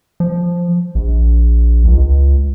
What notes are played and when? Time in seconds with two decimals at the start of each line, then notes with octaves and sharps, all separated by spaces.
0.20 F3
0.95 A#1
1.85 C#2